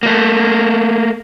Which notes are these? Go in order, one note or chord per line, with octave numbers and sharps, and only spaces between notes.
A3 A#3